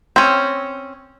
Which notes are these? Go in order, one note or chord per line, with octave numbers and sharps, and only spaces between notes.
C4 C#4